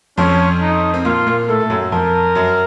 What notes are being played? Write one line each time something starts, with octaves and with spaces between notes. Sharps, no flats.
F2 F3 C#4
D#4
C4
A#2 A#3 F4
A#2 A#3
A2 A3 A4
A3
F#2 F#3
F2 F3 A#4
F#2 F#3